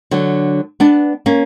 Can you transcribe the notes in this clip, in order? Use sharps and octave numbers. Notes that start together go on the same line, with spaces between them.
D3 F#3
B3 D4
A#3 C#4